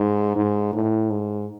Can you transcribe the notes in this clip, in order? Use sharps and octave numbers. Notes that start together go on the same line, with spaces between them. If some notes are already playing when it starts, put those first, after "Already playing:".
Already playing: G#2
G#2
A2
G#2